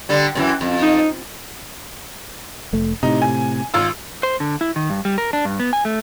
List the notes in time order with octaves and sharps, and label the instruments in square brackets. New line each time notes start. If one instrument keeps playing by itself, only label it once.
[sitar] D3 G3
F#2 C#3 E3
F2
[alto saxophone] D#4
[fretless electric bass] F1 A3
[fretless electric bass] A2 C3 [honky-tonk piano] D#4
[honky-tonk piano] G#5
G#1 F4 E6
[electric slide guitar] C5
D3
E4
D#3
G2
G3
A#4
D4
G2
B3
G#5
A3